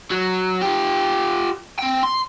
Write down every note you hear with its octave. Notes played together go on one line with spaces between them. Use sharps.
F#3
F4 G4
C4 G5
C6